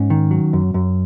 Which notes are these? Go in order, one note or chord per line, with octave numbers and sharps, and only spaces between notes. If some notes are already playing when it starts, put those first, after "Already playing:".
Already playing: G#2 C#4
D#3
F#3
F#2
F#2